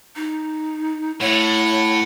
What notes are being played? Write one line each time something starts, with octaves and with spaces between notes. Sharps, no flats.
D#4
A2 C#5 F#5